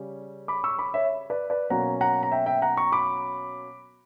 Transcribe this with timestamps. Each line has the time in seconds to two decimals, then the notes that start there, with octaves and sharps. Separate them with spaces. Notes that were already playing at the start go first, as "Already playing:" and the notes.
Already playing: C#3 G3 C#4
0.48 B5 D6
0.64 C#6 E6
0.79 B5 D6
0.94 C#5 E5
1.30 B4 D5
1.50 B4 D5
1.70 B2 F#3 A#3 C#4 F#5 A#5
2.01 F#5 A#5
2.23 A#5
2.32 E5 G5
2.46 E5 G5
2.62 F#5 A#5
2.77 A#5 C#6
2.92 B5 D6